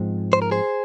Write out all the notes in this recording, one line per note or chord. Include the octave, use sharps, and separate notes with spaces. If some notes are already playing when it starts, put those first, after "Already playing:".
Already playing: G#2 F3 G#3 C4
C5
A#4
G#4 C5